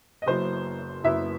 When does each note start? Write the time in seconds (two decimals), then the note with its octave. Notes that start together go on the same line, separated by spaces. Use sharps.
0.22 D#5
0.26 F#1 F#2 F#3 B3 E4 C5
1.04 F#1 F#2 F#3 B3 E4 E5